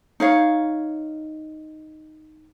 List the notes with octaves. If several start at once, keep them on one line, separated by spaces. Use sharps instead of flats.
D#4 C#5 F5